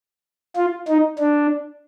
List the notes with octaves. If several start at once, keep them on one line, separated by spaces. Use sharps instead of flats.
F4
D#4
D4